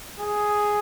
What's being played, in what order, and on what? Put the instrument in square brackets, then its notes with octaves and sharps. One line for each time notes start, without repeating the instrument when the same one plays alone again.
[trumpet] G#4